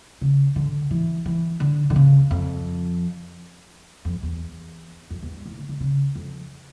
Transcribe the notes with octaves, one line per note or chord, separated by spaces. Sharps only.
C#3
D3
E3
E3
D3
D3
C#3
F2
F2
E2
F2
E2
G2
A2
D3
D3
C#3
F2